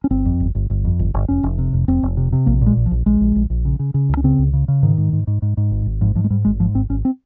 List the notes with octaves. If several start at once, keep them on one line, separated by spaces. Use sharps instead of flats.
C#4
G1 C4
F2
G1
G1
G1
F2
G1
G1
F1 C#4
F1
C3
F1
F1 C4
F1
C3
C3
A#1 A#3
A#2 G#3
A#1
F3
A#1
A#1 G#3
A#1
A#1
A#1
C#3
C#3
C#3
C#2
C#4
C#3 C4
C#2
C#3
C#3
G#2 D#3
G#2
G#2
G#2
G#2
G#2
G#1
G#1
G#2 F3
G#2 F3
G#3
G#2 G3
G#1 G#3
G#2 F3
G#1 C4
G#1 C#4
C4